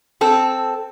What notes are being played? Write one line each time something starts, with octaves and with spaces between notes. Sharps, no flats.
C4 A4